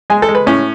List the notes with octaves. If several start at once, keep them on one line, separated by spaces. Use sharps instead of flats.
G#3 G#5
A4
G#3
B4
A2 C#4